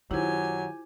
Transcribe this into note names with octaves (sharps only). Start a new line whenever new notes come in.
F#2 D#3 F#3 E4 F4 G4 C5 G#5